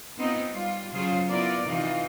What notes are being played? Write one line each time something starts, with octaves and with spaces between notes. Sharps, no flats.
B3 C4 D#4 F4
G3 F4
C#3 F#3 F4 G#4 C5
B3 E4 F4 A#4 D5
C3 E3 D#4 F4